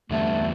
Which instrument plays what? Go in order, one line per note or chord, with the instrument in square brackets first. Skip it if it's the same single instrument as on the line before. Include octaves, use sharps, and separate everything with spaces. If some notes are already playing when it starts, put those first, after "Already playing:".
[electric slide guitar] E2 D3 G3 B3 [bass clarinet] A3